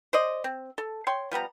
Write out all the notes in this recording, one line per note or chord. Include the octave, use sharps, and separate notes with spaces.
C5 D5 D#5
C4
A4
C#5 G5 C6
F3 G3 B3 A#5